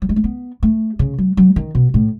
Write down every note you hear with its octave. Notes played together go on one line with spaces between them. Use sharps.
F#3
G#3
A3
B3
A3
C#3
F#3
F#3
D#3
B2
A2